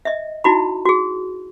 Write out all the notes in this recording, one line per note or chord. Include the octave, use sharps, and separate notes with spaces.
D#5 E5
D#4 E4 F#4 B5
F#4 G#4